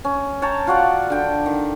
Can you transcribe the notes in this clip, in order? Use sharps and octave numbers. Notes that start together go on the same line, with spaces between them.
C#4
C#5 G5 A5 A#5
F4 F#4 D5 F#5
D3 G5
D#3